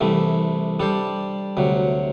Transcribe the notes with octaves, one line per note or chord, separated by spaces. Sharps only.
C2 C3 E3 A3
G3 D4 A4 C5
D2 C3 F#3